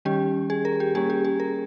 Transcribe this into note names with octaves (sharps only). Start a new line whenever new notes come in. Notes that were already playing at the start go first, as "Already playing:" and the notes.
D#3 G3 C#4 G4
G#4
A#4
G4
G3 A#3 C#4 G#4
G4
G#4
A#4